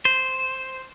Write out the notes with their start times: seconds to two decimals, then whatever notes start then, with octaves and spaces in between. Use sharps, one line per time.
0.05 C5